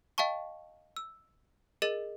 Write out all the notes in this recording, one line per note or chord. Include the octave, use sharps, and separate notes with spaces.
D#5 F5 G5 A5 C#6
E6
G#4 A#4 D#5 A6 D#7